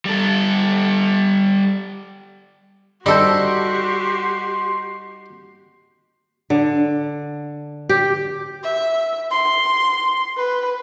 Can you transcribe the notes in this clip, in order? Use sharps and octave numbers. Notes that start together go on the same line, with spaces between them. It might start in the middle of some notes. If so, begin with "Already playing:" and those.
G3 A4
G3 D#4 F#4 G4 A4 C5 C6
D3
G4
E5
C6
B4